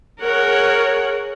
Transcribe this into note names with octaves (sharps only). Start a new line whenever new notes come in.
G#4 A#4 C#5 F#5